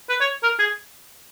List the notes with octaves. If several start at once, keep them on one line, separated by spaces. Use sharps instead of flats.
B4
C#5
A#4
G#4